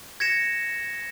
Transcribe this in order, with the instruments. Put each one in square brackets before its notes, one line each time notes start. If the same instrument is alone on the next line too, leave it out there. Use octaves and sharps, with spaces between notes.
[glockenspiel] G#6 A#6 C#7 E7